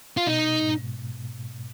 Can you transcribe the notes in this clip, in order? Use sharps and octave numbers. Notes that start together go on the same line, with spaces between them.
F4
B2 D#4
G#2